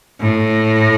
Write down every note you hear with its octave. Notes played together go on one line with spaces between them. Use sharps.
A2